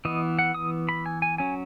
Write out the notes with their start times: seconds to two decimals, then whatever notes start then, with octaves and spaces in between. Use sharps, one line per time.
0.05 E3 B3 D#5
0.39 F#5
0.54 D#6
0.89 B5
1.06 G#5
1.22 G#5
1.38 F#3 C#4 G#5